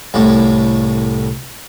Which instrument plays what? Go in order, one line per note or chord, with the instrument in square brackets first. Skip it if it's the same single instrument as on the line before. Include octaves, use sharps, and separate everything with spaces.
[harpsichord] C2 A2